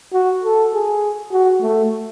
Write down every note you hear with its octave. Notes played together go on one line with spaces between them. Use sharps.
F#4
A4
G#4
F#4
A3